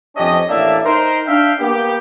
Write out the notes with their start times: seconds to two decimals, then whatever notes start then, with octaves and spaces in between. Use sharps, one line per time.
0.17 F2 C3 C#4 D4 G4 D#5
0.50 A1 A2 A#3 D4 D5 E5
0.85 D#4 A#4 C5
1.27 D4 E5 F5 G5
1.60 A#3 B3 G4